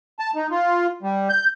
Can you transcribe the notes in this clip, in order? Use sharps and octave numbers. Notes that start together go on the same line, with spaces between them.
A5
D#4
F4
G3
G6